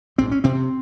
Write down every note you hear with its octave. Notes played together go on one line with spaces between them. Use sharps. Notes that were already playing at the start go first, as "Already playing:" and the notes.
A#1 G#2 C4
C#4
C3 C4
C3